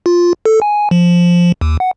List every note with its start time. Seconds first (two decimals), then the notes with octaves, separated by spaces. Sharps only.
0.06 F4
0.45 A4
0.62 G#5
0.91 F3
1.61 D#2
1.80 F#5